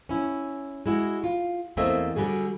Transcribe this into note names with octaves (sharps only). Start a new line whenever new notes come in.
C#4 E4
G#3 E4 F#4
F4
E2 A3 A#3 C4 D#5 E5
D3 G3 F#4 G#4